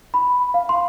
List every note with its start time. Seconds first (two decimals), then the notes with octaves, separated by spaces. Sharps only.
0.14 B5
0.54 F5
0.69 C6